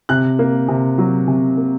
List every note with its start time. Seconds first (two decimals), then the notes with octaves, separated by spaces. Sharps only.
0.09 C3 F#6
0.39 A#3
0.68 C3
0.98 F#3
1.28 C3
1.57 A#3